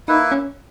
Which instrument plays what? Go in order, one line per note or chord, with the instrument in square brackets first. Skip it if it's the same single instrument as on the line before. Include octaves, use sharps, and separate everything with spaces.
[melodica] A#3 E4 B4 [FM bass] D#4
[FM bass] C#4